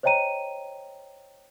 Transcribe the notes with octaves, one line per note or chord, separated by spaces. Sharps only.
C5 C#5 D#5 G5 A#5 D#7